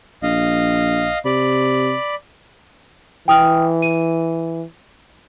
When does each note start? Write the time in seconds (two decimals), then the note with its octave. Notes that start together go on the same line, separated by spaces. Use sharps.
0.23 A#1 D#5 F5
1.25 C3 D5 B5
3.28 E3 G5 D#6 F6
3.82 D#7